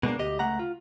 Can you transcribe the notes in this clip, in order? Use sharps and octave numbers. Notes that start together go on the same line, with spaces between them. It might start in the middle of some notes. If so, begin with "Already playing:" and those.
B2 G#3 A#3 D4
D2 G4 D#5
C#2 A3 F#5 A#5
F4